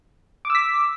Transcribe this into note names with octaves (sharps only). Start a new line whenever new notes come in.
D6 E6 B6